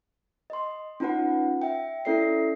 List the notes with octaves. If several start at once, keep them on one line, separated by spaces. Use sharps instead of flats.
D#5 C6
C#4 D#4 F4 B4 F#5
E5 G5
C#4 E4 A4 D5 E5 C7